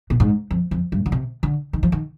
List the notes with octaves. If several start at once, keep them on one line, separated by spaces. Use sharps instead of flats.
B2
G#2
F2
F2
G2
D3
C3
D3
D#3
F3
D#3